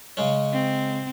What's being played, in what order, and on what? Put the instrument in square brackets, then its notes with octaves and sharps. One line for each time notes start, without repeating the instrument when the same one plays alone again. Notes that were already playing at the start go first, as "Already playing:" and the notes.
[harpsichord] C#3 G#3 C#4
[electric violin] C4